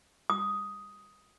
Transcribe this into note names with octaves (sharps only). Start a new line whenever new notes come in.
D#6